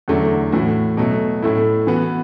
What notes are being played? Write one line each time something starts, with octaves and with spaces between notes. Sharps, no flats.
E2 D3 F#3 A3
A2 E3 A3 F#4
B2 F#3 A3
A2 A3 E4
E3 B3 F#4